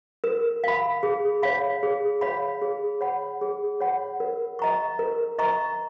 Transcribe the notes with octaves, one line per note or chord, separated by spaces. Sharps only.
A#4
F5 B5
G#4
C#5 F5 B5
G#4
C#5 F5 B5
G#4
C#5 F#5 B5
G#4
C#5 F#5 B5
A#4
D#5 A#5 C#6
A#4
D#5 A#5 C#6